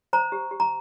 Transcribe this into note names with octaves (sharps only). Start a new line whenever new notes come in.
C5 A#5
G4
G4
A#5